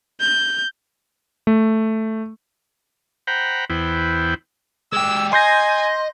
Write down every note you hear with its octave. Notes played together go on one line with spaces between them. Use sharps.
G6
A3
C5 F#5 G5 A#5 B5
E2 B3 E4 C5 G5
G#3 G4 E6
D#5 G#5 C6 G6 A#6